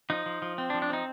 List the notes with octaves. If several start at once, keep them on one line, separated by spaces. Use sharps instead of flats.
F3 D#4
F3
F3
C4
D4
F3
D4
C4 D#4